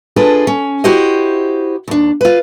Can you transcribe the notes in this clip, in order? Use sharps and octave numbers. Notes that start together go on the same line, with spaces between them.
D4 F4 G#4 A4 B4
C#4
E4 F#4 G4 C5 D#5
D#2 D4
F4 B4